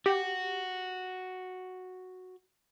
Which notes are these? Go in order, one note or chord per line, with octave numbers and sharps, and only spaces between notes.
F#4 G4